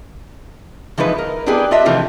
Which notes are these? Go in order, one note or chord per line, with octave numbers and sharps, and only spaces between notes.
E3 F3 G#3 D#4 B4
A#4
B3 D4 E4 G4 G#4 B4
D4 F4 D#5 E5
C3 E3 F3 A3